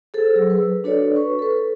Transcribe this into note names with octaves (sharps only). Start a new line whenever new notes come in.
G#4 A4 C5
F#3 G#4 E6
B4
D4 F#4 A4 B4 C#5 D5
B4 C#6
A4 B4